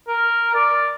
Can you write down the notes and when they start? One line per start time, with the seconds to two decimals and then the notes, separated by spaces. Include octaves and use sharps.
0.08 A#4
0.55 D5